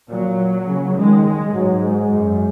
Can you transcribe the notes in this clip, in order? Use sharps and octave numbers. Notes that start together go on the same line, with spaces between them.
A#2 F#3
C#3
D#3 G#3
G#3
G#2 F#3
G#3
F#2